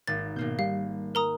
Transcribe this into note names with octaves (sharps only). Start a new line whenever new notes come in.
G#1 A#3 A6
G#1 B2 A#3 G6
G3 F5
A#4 A#5 D#6